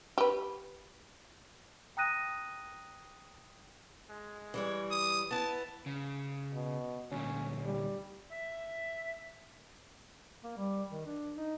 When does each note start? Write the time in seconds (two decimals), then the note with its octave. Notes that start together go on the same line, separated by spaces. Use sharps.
0.18 G4 B4
1.97 G5 A#5 D#6 F#6 A#6 D#7
4.10 G#3
4.54 E3 G3 C#5
4.91 D#6
5.31 B3 E4 A5
5.86 C#3
6.53 B2
7.12 D2 A#2 C#4
7.64 G3
8.31 E5
10.44 A#3
10.57 G3
10.91 D#3
11.06 D4
11.37 D#4